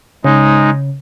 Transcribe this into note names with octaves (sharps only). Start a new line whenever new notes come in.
C#3 G#3 D#4